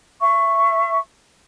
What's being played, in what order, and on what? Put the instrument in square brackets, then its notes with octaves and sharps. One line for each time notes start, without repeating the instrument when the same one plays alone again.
[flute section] E5 C#6